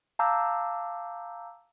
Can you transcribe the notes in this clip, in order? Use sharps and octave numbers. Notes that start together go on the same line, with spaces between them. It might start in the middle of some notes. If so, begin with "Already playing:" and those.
F5 A5 A#5 D6 E6 G6